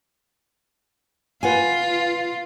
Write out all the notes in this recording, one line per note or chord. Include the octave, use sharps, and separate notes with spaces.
F4 B4 F#5 G#5